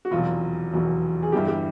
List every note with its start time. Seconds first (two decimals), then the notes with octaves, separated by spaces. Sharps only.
0.05 F#4
0.11 F1 E2 B2 F#3 F4
0.72 F1 E2 B2 F#3
1.23 G#4
1.32 G1 G2 E3 G3 G4
1.48 G4